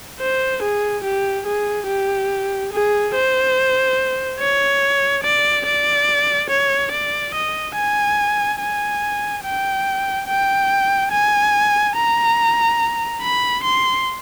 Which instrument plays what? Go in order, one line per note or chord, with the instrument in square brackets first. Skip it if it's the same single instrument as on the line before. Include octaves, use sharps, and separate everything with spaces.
[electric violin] C5
G#4
G4
G#4
G4
G#4
C5
C#5
D5
D5
C#5
D5
D#5
G#5
G#5
G5
G5
G#5
A#5
B5
C6